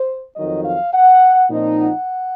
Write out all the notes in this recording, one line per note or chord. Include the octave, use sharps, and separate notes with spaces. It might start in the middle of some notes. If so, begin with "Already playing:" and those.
Already playing: C5
F2 D#3 F#3 D#5
F5
F#5
A#2 F3 C4 D#4
F#5